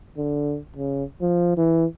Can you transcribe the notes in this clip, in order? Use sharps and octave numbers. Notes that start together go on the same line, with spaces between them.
D3
C#3
F3
E3